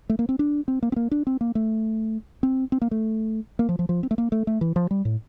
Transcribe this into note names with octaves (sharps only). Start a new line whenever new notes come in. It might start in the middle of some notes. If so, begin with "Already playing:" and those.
A3
A#3
C4
D4
C4
A#3
C4
A#3
D4
C4
A#3
A3
C4
C4
A#3
A3
A#3
F3
F3
F3
C4
A3
A#3
A3
A3
E3
F3
G3
A2